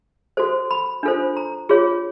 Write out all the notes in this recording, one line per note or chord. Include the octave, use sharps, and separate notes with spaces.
F#4 A4 C5
B5
D4 F4 A4 C5
A#5
F4 G#4 C#5